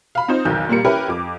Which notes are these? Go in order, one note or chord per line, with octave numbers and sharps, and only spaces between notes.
F5 B5
C4 D#4 F4 C5
B1 E2 D#3 G6
A#2 G3 A#3 C#7
C#4 E4 G4 A#4 B4
F2 D6